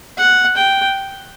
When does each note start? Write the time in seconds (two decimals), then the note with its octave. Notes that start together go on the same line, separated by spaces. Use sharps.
0.17 F#5
0.57 G5